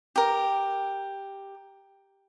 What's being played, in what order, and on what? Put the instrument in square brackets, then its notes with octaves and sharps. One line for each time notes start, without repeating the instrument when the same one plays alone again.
[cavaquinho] G4 A#4